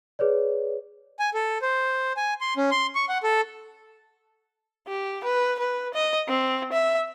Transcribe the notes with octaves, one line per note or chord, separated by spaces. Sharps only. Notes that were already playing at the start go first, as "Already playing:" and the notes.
G#4 B4 C#5 D5
G#5
A4
C5
G#5
C6
C#4
C6
C#6
F#5
A4
G4
B4
B4
D#5
C4
E5